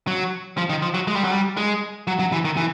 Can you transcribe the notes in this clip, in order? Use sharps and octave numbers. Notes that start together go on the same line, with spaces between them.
F#3
F3
D#3
F3
F#3
G#3
G3
F#3
G3
G#3
F#3
F#3
E3
D#3
E3